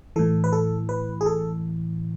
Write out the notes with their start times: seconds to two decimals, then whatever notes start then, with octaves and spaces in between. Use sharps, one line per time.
0.16 A2 E3 A4
0.44 B4
0.53 A4
0.89 B4
1.21 G#4
1.26 A4